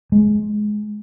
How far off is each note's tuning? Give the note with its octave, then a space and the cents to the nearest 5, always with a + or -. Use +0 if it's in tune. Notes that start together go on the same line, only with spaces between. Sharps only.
G#3 +15